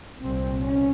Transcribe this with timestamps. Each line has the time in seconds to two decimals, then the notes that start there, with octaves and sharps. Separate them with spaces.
0.21 C2 A#2 C4
0.62 C#4